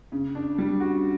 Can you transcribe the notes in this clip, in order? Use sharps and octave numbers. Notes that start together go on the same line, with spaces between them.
C#3
D4
G3
F#4